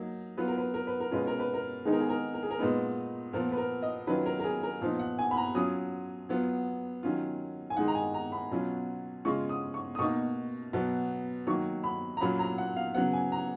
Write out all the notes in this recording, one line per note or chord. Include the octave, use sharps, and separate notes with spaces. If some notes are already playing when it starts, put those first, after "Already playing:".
Already playing: F#3 A#3 D#4
F#3 B3 F4 B4
A#4
B4
A#4
B4
A#4
B2 G#3 C#4 F4 B4
A#4
B4
A#4
D#3 G#3 B3 D#4 G#4
A#4
G#4
A#4
A#4
G#4
A#4
A#2 G#3 B3 D#4 B4
A#2 F3 B3 F4 A#4
B4
A#4
D#5
D#3 F#3 C#4 F4 B4
A#4
A#4
G#4
A#4
A#2 F3 B3 D#4
F#5
G#5
B5
A#5
F#3 C#4 F4 D#6
F#3 B3 F4
D#3 F#3 C#4 F4
G#5
D#3 G#3 D#4 F#5
A#5
G#5
A#5
B5
B2 F#3 C#4 F4
C#3 G#3 C#4 F4 C#6
D#6
C#6
D#6
B2 A#3 D#4 C#6
B2 F#3 B3
D#3 F#3 A#3 C#6
B5
A#5
A#2 F#3 C#4 F4 B5
A#5
F#5
F5
C#3 F#3 B3 F#5
G#5
A#5